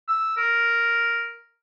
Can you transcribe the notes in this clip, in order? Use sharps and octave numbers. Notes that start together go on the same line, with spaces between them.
E6
A#4